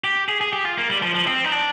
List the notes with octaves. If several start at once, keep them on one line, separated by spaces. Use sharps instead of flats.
G4
G#4
G#4
G4
F4
A#3
G3
F3
F3
C4
D#4
D4